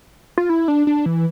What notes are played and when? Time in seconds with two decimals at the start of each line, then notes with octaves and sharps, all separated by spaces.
0.38 F4
0.49 E4
0.68 D4
0.87 D4
1.06 E3